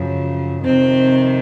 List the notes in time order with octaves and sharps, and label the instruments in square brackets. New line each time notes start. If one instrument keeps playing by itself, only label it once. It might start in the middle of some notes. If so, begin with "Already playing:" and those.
Already playing: [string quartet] F#2 C#3 F3
F2 C3 D#3 C4